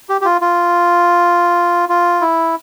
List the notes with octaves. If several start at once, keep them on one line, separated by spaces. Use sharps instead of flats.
G4
G4
F4
F4
F4
E4